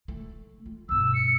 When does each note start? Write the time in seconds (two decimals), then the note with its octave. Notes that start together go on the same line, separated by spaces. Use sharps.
0.08 A3
0.66 F4
0.89 G1 B2 E6
1.14 C#7